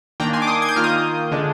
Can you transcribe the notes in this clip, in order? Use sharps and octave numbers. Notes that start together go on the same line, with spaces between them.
D#3 A#3 D4 G5 A#5
G#5 C6
D6
C6 D#6
G#6
G6
D#3 A#3 F4 F6
D#6 G6
D3 G#3 D4